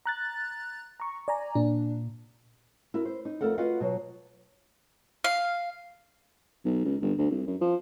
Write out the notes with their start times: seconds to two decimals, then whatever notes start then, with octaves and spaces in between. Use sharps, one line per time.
0.06 A#5 F#6 A6
1.00 A#5 C#6
1.28 D5 G#5 A#5
1.55 A#2 D4
2.94 E4 F#4 A#4
3.05 C5
3.25 D#4
3.41 F2 G#2 A3 A4 A#4 F#5
3.58 F4 F#4 B4 D#5 F5 F#5
3.80 B2 F#3
5.24 F5
6.65 B1
6.85 C#2
7.02 G1
7.18 D2
7.31 C2
7.47 F#2
7.61 F3